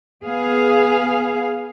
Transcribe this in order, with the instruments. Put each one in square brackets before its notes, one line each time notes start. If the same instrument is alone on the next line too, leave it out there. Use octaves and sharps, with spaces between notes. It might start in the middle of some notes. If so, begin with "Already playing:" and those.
[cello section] B3 G#4 F5